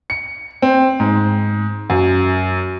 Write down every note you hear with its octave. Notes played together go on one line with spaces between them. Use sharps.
C#7
C4
G#2
F#2